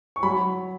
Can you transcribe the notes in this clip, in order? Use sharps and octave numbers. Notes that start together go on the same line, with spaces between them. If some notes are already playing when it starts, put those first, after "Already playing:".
C#6
F#3 B5